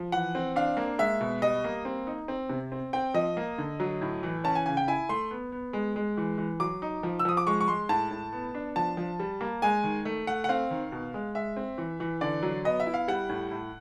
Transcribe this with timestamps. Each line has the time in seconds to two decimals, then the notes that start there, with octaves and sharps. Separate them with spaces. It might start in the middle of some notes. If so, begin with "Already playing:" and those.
Already playing: F3
0.12 E3 F#5
0.35 C4
0.56 D4 F5
0.77 A#3
0.99 G#3 E5
1.21 B2
1.42 G3 D#5
1.64 A#3
1.85 C4
2.07 D#4
2.28 C4
2.50 C3
2.72 C4
2.93 C4 G5
3.14 F3 D#5
3.37 A#3
3.58 D3
3.80 F#3
4.02 A2
4.23 E3
4.44 C#4 A5
4.55 G#5
4.66 C#3 G#5
4.77 G5
4.88 E4 G#5
5.09 A3 C6
5.31 B3
5.52 B3
5.73 G#3
5.96 G#3
6.17 E3
6.38 E3
6.60 F#3 D6
6.82 D#4
7.03 F3
7.19 E6
7.25 F3 D#6
7.37 D6
7.47 G#3 C#6
7.61 C#6
7.68 G#3 C6
7.89 A2 A5
8.11 A2
8.32 B3
8.55 D4
8.76 F3 A5
8.97 F3
9.20 G3
9.41 A#3
9.62 G#3 G#5
9.83 D#3
10.05 A3
10.27 A3 F#5
10.44 F#5
10.49 C4 F5
10.70 D#3
10.92 B2
11.14 G#3
11.35 G#3 E5
11.57 C4
11.78 E3
12.00 E3
12.21 D3 D5
12.43 F#3
12.65 B3 D#5
12.80 E5
12.86 E4
12.94 F5
13.08 G3 F#5
13.30 A2
13.51 A2